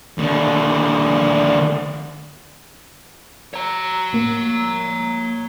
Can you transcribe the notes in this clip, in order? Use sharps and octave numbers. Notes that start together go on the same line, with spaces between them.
D#2 D3
C#5 A#5
A2 A#3